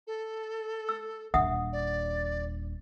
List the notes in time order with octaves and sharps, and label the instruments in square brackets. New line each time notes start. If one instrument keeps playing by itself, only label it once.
[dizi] A4
[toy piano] E6
[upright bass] D#1 D4 [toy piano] E5 F#5 D#6
[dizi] D5